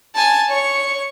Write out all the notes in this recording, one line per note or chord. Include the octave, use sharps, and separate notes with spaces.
G#5 A5
C#5 C#6